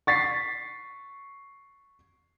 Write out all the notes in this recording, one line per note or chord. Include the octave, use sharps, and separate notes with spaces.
C#6 A6 B6 C7